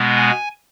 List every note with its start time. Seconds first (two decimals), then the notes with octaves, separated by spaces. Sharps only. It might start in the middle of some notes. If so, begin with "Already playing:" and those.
Already playing: B2 G#3 B3
0.16 G#5